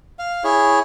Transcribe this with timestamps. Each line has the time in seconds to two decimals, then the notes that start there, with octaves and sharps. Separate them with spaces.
0.19 F5
0.44 E4 G#4 C#5